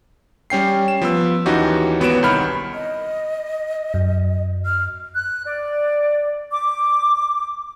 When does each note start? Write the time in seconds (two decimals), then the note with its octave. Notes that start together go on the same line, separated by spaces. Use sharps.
0.50 G3 C#4 G5 C7
0.88 E7
1.02 F3 B3 E6
1.46 D#2 E3 C#4 D#4 F#4 G4
2.00 G#1 B3 F#4 C#5 D7 E7
2.23 C2 D#3 B5 F6
2.74 D#5
3.94 F#2
4.66 F6
5.15 F#6
5.46 D5
6.51 D6